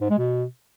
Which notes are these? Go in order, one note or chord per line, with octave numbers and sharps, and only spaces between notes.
G#2
G#3
B2